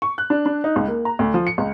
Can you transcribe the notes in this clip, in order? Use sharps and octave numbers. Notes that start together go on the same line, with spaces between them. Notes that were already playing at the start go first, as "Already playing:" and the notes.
C#6
F#6
D4
D4
D#4
C#2
A#3
A#5
D2
F3
C#7
C#2